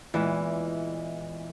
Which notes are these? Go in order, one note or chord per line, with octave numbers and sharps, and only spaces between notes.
E2 A#2 E3 G#3